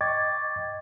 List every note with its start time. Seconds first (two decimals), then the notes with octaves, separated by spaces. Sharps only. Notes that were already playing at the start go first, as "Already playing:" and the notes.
0.01 D#5 G5 C#6 D6 G#6 A6